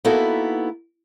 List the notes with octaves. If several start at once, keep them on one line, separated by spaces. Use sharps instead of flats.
A#3 B3 D#4 E4 F#4 A4